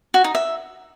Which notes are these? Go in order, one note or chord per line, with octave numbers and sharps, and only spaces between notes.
F#4
D#4
E5